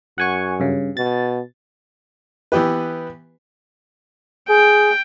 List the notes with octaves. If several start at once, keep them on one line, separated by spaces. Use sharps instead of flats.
F#2 F#5 G#5 C#6
G2 C#3
B2 A6
E3 B3 G4 B4
G#4 G5